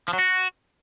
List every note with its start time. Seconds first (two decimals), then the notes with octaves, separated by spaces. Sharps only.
0.08 F3
0.13 F#3
0.19 F#4